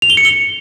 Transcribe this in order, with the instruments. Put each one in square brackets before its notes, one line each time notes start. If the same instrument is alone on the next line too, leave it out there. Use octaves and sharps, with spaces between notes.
[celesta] F7
G7
C#7
G7